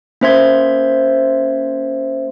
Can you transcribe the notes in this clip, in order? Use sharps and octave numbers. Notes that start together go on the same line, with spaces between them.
A#3 C#4 C5 E5 C6 G#6